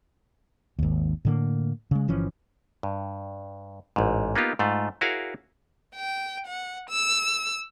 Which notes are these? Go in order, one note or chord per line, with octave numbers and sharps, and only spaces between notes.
G#1 D#2
A2 D3 A#3
C#3 G#3
G1 E3 F3 C#4
G2
A1 G#2
A#3 B3 D#4 F4 G4
G#2 A3 F4
E4 F#4 G#4 A#4 C#5 F5
G5
F#5
E6